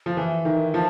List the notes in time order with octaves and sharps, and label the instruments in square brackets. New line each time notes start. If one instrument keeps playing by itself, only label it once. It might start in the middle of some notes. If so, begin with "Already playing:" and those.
[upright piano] F3
[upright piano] E3 [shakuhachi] E5
[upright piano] D#3
[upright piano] F3 [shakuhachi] A5